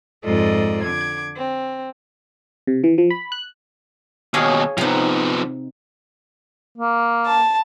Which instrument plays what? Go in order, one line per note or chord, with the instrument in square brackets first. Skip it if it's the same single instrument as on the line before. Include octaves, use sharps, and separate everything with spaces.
[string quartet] F2 G#2 F4 A4 D5 D#5
D3 D6 G#6
C4
[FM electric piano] C3
E3
F3
B5
F#6
[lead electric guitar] D#2 B2 [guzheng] G#4 C#5 F5
[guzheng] C3 D#4 [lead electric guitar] F3 B3
[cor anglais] A#3
[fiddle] A5